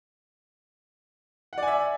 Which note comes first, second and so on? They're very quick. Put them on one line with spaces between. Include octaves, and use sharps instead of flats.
F#5 D5 G#5 E5